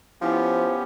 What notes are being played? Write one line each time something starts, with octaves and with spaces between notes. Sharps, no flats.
F3 B3 C#4 E4 G4 C5